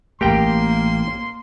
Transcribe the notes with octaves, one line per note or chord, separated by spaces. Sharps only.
A1 A3 A#3 G4 A#4 G5 C6